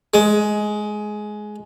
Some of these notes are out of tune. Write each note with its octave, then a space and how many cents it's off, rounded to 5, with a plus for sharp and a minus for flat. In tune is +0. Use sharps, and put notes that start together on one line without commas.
G#3 +15